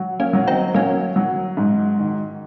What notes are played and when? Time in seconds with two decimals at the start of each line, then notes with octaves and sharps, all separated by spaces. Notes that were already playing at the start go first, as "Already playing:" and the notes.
Already playing: F#3
0.20 A#3 C#4
0.33 F#3
0.47 C4 D#4
0.74 F#3 A#3 C#4
1.16 F#3
1.57 G#2
1.99 D#3